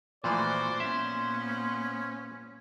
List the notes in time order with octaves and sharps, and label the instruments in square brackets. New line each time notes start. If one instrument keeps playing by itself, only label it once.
[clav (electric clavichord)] A#2 E3 F3 [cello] A3 F#4 [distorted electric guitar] C5 [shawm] D5
[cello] A#2 B3 [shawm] C#4 [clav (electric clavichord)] E5